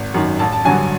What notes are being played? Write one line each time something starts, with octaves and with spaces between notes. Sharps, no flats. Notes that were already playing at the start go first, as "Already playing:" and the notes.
Already playing: G#1
F#2 D#3
A1 A5
A5
G2 D3 F#3 G#5